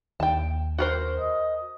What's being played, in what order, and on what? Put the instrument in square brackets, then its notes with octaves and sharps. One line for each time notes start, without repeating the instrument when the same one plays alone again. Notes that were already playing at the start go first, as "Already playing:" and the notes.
[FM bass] D#2 [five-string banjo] G5 A5
[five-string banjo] F#4 A#4 C5
[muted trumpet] D#5